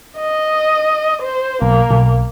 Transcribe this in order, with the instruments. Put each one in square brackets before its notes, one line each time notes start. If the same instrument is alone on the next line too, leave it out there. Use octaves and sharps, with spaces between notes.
[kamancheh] D#5
C5
[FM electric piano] B1 [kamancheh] A#3
[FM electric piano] B1